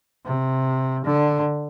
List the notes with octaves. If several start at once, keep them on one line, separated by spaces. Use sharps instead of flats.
C3
D3